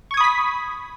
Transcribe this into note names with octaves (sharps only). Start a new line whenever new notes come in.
B5 C#6 D#6 G#6 B6